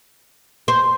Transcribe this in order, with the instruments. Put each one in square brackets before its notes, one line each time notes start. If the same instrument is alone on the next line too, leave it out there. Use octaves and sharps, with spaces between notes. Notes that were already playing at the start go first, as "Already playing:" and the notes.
[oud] C5